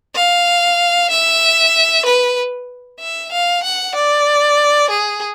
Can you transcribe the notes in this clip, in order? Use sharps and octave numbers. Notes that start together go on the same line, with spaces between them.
F5
E5
B4
E5
F5
F#5
D5
G#4